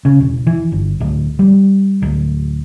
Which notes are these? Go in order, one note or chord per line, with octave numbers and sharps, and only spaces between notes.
C#3
E1
E3
G1
D1
G3
D1